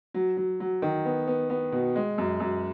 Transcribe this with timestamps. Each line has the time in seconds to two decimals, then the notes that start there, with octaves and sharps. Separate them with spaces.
0.14 F#3
0.37 F#3
0.60 F#3
0.82 D#3
1.05 B3
1.27 B3
1.50 B3
1.72 B2
1.96 G#3
2.18 F#2
2.40 F#2